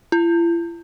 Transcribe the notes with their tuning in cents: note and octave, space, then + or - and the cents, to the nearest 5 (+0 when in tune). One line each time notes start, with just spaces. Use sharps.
E4 +45